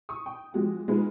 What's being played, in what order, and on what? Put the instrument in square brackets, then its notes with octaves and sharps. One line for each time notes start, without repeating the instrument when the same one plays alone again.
[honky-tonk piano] C#6 D#6
G5
F3 G#3 F#4 G4
G#3 B3 D#4 F4 G#4 B4